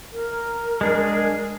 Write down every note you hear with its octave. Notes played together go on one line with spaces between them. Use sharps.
A#4
G#3 D4 G#4